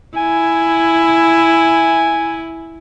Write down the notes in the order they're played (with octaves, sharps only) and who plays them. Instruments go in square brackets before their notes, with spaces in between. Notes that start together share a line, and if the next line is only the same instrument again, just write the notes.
[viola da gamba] E4 [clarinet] G#5